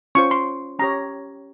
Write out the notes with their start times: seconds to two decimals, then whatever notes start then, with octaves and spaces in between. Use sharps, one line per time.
0.15 C#4 F4 C5 C#6
0.31 C6
0.79 C#4 G4 C#5 A#5